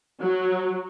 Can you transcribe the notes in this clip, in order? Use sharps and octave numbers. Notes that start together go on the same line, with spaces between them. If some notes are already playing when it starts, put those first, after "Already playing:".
F#3